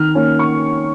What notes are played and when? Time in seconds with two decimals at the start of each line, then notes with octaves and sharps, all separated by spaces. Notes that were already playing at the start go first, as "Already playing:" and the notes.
Already playing: D#3 F6
0.15 A#3 C#4
0.39 C#6